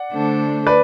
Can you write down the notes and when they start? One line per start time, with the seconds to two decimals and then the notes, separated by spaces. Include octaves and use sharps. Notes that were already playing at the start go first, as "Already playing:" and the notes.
Already playing: D5 F#5
0.11 D3 A3 D4 A4 C5
0.67 B4 D5